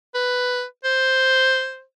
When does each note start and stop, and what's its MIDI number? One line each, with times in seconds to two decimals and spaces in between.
0.15 0.64 71
0.84 1.83 72